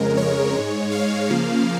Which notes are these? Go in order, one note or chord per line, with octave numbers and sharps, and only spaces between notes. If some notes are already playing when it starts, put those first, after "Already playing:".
Already playing: F2 C#3 G#3 A#4
C#5
G#2 G#3
F5
C#3 F3 A#3